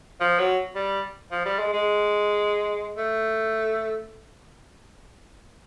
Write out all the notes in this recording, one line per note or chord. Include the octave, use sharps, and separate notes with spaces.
F3
F#3
G3
F3
G3
G#3
G#3
A3